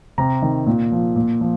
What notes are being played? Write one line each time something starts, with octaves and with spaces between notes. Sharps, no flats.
C3 A#5
D#3
A#2
F3
A#2
F3